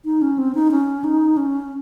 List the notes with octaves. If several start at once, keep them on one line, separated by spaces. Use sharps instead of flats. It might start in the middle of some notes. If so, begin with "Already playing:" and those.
D#4
C#4
C4
D#4
C#4
D#4
C#4